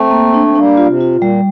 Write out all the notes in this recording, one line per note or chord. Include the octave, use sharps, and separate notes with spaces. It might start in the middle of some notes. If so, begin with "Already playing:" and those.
Already playing: A3 C4
A#3
D4
C4
G3 A#3 D4
F4
C3
F4
A#2
G3